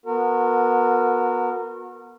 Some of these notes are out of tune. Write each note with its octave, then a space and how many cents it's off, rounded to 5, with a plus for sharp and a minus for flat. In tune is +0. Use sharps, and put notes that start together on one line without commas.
B3 -20 F#4 -30 A#4 -30